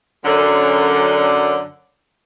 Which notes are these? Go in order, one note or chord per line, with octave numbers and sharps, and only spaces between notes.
F#2 D3